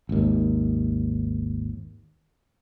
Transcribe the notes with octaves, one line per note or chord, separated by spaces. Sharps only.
G#1 D#2